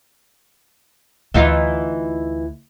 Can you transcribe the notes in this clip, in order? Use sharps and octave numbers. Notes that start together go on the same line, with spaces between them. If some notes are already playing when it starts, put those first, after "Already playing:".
D2 E3 D#4 F4